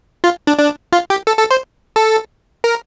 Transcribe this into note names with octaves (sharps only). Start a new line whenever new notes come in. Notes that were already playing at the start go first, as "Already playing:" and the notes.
F4
D4
D4
F4
G4
A4
A4
C5
A4
A#4